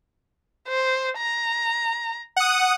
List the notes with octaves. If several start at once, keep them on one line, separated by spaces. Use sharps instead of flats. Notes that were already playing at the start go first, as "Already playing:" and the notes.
C5
A#5
F#5 D#6